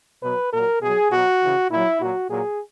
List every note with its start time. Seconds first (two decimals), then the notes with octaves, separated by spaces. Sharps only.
0.23 B2 F#3 B4
0.52 A#2 F#3 A#4
0.82 B2 F#3 G#4
1.11 B2 F#3 F#4
1.41 C#3 E3
1.70 A#2 F#3 E4
2.00 A#2 F#3 F#4
2.29 A#2 F#3 G#4